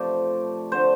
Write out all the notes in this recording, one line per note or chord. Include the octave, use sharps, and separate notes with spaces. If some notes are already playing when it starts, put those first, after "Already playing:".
Already playing: C3 F3 A3 D5
D3 A3 C5